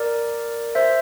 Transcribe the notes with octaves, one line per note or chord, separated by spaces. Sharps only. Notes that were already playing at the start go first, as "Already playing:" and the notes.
Already playing: A#4 D5
C5 E5